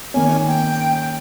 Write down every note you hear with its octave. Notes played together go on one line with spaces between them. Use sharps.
D#3 A#3 C#4 G#5
G5